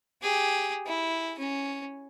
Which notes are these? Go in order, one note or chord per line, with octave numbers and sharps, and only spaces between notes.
G4 G#4
E4
C#4